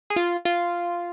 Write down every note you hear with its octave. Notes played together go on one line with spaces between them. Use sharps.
G#4
F4
F4